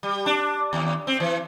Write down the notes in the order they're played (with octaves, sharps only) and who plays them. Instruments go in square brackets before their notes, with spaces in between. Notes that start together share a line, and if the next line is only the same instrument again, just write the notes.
[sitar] G3
D4
D#2
C4
E3